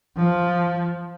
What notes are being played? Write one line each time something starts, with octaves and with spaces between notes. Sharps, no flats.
F3